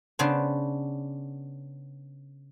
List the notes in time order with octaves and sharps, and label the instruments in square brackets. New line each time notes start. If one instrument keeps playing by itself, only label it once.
[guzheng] C#3 B3 D4 C5